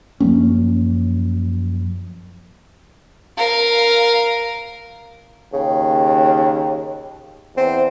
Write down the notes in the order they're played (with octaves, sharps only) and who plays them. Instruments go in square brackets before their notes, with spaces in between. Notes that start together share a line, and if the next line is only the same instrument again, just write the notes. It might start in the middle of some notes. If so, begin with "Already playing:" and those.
[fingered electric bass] F#2 F3 A#3 C#4
[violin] A#4 F5
[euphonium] D#2 [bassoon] C#3
[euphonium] E2 [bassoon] C4